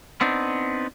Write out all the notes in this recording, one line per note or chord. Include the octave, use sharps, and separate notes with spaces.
B3 C4 D4 D#4